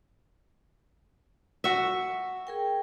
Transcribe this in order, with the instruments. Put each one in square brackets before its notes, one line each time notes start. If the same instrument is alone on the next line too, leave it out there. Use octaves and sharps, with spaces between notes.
[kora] F#4 E5
[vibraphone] G#4 A#4 G5